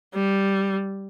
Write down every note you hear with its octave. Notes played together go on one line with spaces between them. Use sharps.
G3